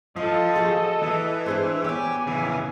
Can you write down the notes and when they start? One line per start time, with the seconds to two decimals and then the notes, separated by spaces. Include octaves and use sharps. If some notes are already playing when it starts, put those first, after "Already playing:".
0.16 F3 F4 A4 D#5
0.56 F#4 G#4
1.03 E3
1.46 D4 G#4 C5
1.84 B3 G4 C#5 D5 G#5
2.27 C#3 E3